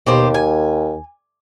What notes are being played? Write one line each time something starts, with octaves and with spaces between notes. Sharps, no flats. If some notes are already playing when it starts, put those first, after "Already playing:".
D#2 B2 G4 C5
G#5